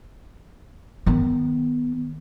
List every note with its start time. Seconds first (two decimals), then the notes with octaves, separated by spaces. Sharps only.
1.06 D#3 B3